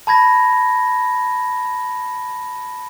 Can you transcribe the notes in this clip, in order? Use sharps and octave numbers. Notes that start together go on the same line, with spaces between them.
A5 B5 G#6 A#6